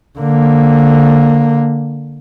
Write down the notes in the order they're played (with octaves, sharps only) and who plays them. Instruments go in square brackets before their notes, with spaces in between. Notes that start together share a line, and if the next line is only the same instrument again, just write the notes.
[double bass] D3 A#3